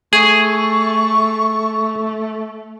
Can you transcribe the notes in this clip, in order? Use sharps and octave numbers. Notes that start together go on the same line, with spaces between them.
A3 G#4 C#6